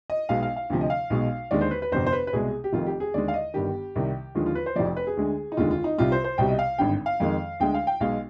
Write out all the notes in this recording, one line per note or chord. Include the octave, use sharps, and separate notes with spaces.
D#5
B1 B2 G#3 F5
F5
F5
D2 C3 F3
D#5
F5
B1 B2 G#3
D#2 D3 G#3 D5
C5
B4
B4
G1 F2 C3 C5
C5
B4
B4
C2 B2 G#3 G#4
G4
F1 F2 D#3 F4
G4
G#4
D#2 D3 G#3 D5
F5
D#5
G1 G2 D#3 G4
C2 C3 D#3 G3
D#2 D3 F3 G#3 F4
F4
B4
C5
F1 F2 C3 F3 D5
B4
G#4
D2 D3 G#3
D#4
F1 D#2 D3 G#3 F4
F4
D#4
C2 C3 G3 F4
C5
C5
C2 B2 G3 G5
D#5
F5
G#1 G2 D3 G5
F5
F2 D#3 G#3
D2 D3 G#3 G5
F5
G5
B1 B2 G#3 F5